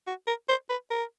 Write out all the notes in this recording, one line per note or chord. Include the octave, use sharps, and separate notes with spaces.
F#4
A#4
C5
B4
A#4